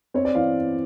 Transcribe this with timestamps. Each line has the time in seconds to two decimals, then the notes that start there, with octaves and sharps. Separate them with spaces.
0.14 C4 C#5
0.25 D5
0.35 E3 F5